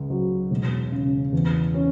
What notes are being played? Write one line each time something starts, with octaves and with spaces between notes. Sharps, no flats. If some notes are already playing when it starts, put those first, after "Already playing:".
Already playing: C#2
F#3
E1
C#3
E2
C#4